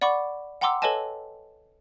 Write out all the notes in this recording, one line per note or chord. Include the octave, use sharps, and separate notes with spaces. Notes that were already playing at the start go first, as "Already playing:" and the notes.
D5 F#5 B5 C#6 D6
F#5 G5 A#5 C6 D6 E6
A4 B4 C#5 D#5 G#5 A5